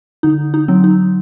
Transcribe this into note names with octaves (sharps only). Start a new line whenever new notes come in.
D3 D#4
D#4
F#3 C4
D#4